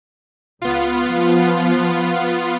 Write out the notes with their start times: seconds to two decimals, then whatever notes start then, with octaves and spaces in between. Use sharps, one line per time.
0.62 C#2 B3 F4
1.11 F3